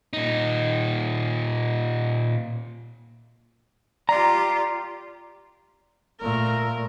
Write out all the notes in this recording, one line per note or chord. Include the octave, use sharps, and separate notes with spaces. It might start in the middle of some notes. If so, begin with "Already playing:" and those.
A#2 D#4
F4 G4 D5 A#5
A#2 A3 A#4